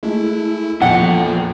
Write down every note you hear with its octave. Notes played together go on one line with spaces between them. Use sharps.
G#3 A3 E4
A#1 E2 F3 A4 F#5 G5